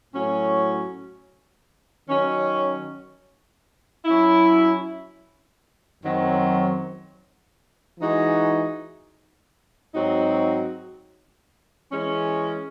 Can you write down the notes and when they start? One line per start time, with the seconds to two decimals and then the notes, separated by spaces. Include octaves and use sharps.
0.12 A2 F#3 C#4 F#4
2.08 D#3 F#3 C#4
4.05 F#3 C#4 E4
6.02 F#2 D#3 F#3 C4
7.98 E3 G#3 D#4 F#4
9.95 G#2 F#3 C4 D#4 F#4
11.91 E3 G#3 C#4